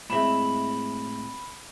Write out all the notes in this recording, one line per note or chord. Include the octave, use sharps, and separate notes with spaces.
A2 G#3 C4 E5 B5 E7